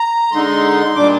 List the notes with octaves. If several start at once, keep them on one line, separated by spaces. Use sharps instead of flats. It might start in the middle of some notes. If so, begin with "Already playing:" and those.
Already playing: A#5
D3 G#3 D#4 C6
A#2 G3 D4 D6